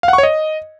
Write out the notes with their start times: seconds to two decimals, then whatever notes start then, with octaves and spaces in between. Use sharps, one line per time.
0.03 F5
0.08 F#5
0.13 C#6
0.18 C#5
0.23 D#5